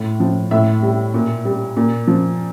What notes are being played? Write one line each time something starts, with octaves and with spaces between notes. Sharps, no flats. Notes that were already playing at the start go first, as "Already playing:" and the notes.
Already playing: A2
F3
A2 E5
G3
A#2
G3
A#2
F3